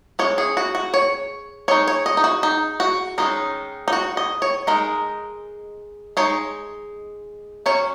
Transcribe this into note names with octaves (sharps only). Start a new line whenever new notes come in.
G#3 C#4 C#5
G#4
F#4
F#4
C#5
G#3 D#4 C#5
C#5
D#5
D#4
F#4
D#4
F#4
D#3 G#3 C#4 D#4
D#4
F#4
D#5
C#5
G#3 D#4 A#4
G#3 D#4 C#5
F#3 C#4 C#5